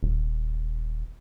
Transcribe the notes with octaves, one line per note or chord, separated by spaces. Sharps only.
D#1